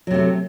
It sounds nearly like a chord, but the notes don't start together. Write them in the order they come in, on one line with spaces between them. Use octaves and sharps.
F#3 C3 A3